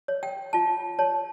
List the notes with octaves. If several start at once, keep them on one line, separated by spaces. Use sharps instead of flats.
C#5
G5
F4 A5
C#5 A5